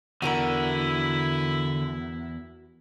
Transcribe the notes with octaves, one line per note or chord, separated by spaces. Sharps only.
E2 D3 E4 F#4 G4 A#4